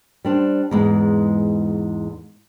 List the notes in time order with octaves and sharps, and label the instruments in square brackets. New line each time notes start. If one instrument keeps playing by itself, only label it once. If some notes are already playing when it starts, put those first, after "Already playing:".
[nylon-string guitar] G3 D4 C5
E2 G#2 G#3